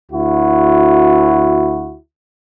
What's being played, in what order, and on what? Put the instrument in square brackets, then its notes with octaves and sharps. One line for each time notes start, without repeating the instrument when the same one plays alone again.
[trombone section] D2 E4 F#4